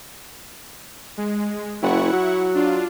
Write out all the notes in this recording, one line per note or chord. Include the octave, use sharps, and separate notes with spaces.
G#3
F#1 E4 F#5 C#6
F#3
D4 F4